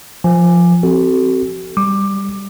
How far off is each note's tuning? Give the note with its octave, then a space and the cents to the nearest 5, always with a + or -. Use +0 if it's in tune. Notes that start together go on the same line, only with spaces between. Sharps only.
F3 +0 G#5 +0
C4 +0 F#4 +40 A4 +0
G3 +5 D6 +15